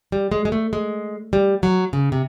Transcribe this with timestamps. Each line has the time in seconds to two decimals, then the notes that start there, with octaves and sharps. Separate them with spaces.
0.12 G3
0.32 G#3
0.45 G#3
0.52 A3
0.73 G#3
1.33 G3
1.63 F#3
1.93 C#3
2.12 C3